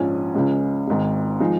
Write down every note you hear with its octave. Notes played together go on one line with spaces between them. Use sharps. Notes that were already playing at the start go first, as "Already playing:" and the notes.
Already playing: A#1 G#2 F3 C#4 G#5
C#2 C#3 G#3 C#4
G#1 G#2 G#3
F3 G#3 D#4